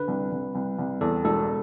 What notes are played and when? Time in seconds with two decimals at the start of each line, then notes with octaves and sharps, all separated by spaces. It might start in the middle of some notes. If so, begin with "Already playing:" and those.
Already playing: D3 B4
0.08 C2
0.32 C2
0.55 C2
0.79 C2
1.01 E2 A4
1.25 E1 A4